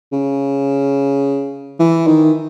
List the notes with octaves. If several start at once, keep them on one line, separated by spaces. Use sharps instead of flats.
C#3
E3
D#3